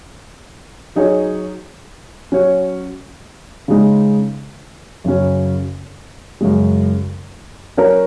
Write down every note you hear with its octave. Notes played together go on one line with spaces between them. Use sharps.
F#3 D#4 G#4 C#5
F#3 C#4 F#4 C#5
C#3 G#3 D#4
F#2 C#3 F#3 C#4
F#2 C#3 G#3
F#3 C#4 A#4 C#5